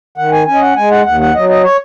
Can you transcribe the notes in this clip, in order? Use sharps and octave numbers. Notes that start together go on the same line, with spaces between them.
D#3 F#5
G#5
C#4 G#5
D#5
F#5
G#3 G#5
F#5
D#2 F#5
F#5
F#3 D#5
D#5
C#5